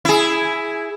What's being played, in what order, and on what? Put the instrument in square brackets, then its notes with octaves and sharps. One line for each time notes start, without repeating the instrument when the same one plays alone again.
[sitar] E4 G#4